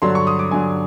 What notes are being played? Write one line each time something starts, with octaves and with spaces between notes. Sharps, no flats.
G2 D3 F#3 C6
C#6
D#6
D6
G2 D3 F#3 G#5